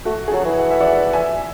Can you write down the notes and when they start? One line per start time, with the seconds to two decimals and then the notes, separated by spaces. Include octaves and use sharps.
0.05 A3 F#4
0.28 G#4
0.32 F#3 F#4 A4
0.45 E3
0.59 F#5
0.71 E5
0.80 D5 F#5
1.13 E5 G#5